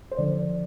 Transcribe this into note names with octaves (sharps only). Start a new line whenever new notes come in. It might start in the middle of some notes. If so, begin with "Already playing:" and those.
C5
D3 F3 D5